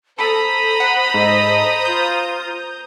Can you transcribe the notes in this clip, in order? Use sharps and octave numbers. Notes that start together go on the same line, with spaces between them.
A4 C5 A#5 B5 D#6
F#5
G#2 A4 D#5
F4 G6